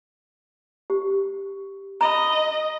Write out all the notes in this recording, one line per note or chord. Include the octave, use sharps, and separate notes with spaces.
G4
D#5 A#5 B5